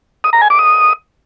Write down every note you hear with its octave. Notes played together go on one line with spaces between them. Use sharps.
D#6
A#5
G#5
D6
D#6